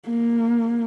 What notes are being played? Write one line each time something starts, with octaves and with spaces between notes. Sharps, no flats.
A#3